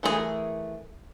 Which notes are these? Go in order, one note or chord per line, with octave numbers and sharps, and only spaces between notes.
E3 A3 C4 G#4 A#4